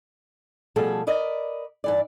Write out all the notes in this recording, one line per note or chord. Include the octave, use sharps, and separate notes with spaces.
B2 F3 G3 A3 G#4 A4
A#4 B4 D5 D#5
G2 E3 D5